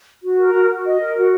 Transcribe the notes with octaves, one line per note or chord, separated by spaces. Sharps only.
F#4
A#4
F#4
F#4
D#5
A#4
F#4